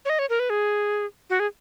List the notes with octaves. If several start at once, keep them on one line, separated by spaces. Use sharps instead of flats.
C#5
D#5
C#5
A#4
B4
G#4
F#4
G#4